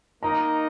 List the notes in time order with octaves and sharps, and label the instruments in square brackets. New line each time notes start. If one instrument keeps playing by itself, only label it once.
[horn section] D#3 A#3 D#4 [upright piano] A#5